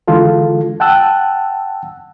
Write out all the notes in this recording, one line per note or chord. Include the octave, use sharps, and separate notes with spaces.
D3 E3 G#3 F4 A4
F#5 G5 A5 E6 F#6